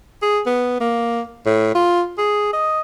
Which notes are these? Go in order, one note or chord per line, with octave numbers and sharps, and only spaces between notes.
G#4
B3
A#3
A2
F4
G#4
D#5